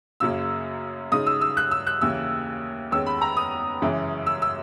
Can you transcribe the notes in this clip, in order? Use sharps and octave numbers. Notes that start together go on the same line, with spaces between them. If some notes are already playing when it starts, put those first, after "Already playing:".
F#2 C#3 F#3 A#3 E6
C#3 G#3 D#4 D#6
E6
E6
F#6
E6
F#6
D#2 C#3 E3 A#3 E6
E2 D#3 G#3 C#4 E6
B5
A#5
D#6
F#2 C#3 E3 G#3 C#4
E6
E6